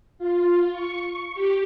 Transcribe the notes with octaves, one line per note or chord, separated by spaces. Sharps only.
F4
C#6
G4